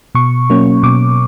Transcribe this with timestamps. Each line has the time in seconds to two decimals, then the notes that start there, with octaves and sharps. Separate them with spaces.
0.15 B2 C#6
0.50 F#3 A#3 C#4
0.83 B2 D6